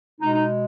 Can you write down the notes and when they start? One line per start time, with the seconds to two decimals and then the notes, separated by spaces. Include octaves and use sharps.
0.21 B2 G#3 D#4
0.33 D#4